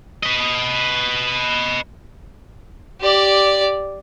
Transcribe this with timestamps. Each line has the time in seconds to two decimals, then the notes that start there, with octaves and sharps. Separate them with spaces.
0.23 B4 D#5
3.01 G4 D5